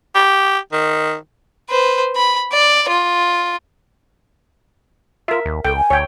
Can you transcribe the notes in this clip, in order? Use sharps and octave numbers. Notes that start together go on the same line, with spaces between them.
G4
D#3
B4 C5
B5
D5
F4
F4 A#4 E5
D#2
C#2 A4 G5
G#5
D2 C#5 G5